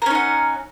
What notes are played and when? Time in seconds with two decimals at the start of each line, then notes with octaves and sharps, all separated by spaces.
0.02 A#4
0.06 C#4
0.10 D#4
0.15 F#5